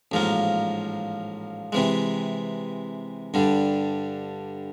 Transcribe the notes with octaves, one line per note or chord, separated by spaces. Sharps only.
A1 G#2 F3 A#3
C3 E3 G#3
G2 D3 G3